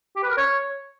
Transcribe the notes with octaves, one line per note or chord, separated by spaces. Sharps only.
G4
B4
A#4
C#5